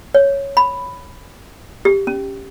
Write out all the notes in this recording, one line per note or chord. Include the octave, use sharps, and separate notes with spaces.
C#5
B5
G4
C#4